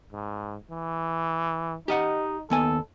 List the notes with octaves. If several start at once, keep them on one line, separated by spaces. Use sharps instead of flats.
G#2
E3
D#4 G4 D#5 F#5
D#2 B3 A4 G#5